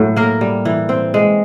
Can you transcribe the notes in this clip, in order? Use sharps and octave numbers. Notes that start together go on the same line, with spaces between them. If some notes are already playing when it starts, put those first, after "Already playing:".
Already playing: A2 F#3
A#3 A#4
G3
E3
C4
G#3